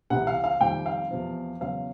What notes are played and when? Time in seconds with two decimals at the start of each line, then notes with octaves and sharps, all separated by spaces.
0.10 C2 C3 E3 F#5
0.27 F5
0.44 F5
0.60 F2 C3 D#3 G3 G5
0.86 F5
1.11 E2 C3 F3
1.61 E2 C#3 F#3 F5